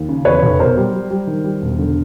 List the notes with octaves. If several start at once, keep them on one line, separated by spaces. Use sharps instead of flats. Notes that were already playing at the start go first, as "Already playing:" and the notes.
Already playing: D#2
C#3
E2 B4 C#5
F1
B2 A#4 C5
G3
G3
G3
D#3
G3
E1
D3